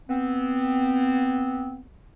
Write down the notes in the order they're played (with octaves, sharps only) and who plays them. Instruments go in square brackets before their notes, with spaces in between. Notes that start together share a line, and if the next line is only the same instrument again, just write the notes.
[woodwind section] B3 C4